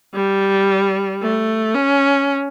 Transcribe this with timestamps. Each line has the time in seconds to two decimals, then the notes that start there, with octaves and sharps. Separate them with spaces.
0.14 G3
1.22 A3
1.74 C#4